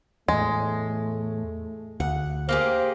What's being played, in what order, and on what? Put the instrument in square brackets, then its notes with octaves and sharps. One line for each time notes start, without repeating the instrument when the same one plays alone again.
[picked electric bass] E2 A2 [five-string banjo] G#3 [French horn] A3
[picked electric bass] D2 [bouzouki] F#5
[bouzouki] A#3 G4 G#4 [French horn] C5